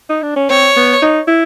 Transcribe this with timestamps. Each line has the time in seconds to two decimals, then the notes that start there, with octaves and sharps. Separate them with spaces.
0.10 D#4
0.23 D4
0.36 C#4
0.50 C4 C#5
0.76 B3
1.02 D#4
1.28 E4